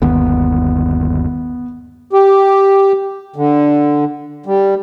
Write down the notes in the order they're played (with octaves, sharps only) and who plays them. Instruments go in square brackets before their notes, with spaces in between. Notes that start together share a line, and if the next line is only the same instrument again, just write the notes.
[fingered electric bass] G1 D#2 [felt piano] B3
[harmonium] G4
D3
G3